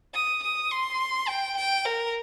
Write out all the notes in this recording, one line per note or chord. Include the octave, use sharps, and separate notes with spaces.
D#6
D#6
C6
G5
G5
A#4